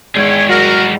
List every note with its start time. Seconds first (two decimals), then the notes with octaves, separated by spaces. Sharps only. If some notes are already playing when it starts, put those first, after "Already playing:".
0.15 E2 G#2 D#3 G#4 C#5 G5
0.49 F#3 G3 F#4 A#4 F#5